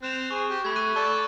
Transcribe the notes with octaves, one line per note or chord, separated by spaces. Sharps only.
C4 F#6 E7 F7
G#4 C#6
G4
A3 B5 G#6
C#6 F#6 D#7
A4 D5 C#6